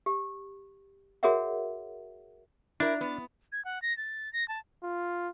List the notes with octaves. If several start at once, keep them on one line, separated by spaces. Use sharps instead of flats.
G4
F#4 G#4 A#4 C#5 E5 F#5
D4 E4 A#4
B3
G#6
F#5
A#6
A6
A#6
A5
F4